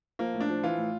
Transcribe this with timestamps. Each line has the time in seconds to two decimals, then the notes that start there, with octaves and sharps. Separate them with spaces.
0.19 F3 A#3
0.34 A2
0.41 D4
0.49 F3
0.63 E3 F4
0.77 A2